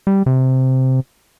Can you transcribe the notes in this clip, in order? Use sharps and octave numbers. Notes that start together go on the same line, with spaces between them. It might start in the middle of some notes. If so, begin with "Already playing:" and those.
G3
C3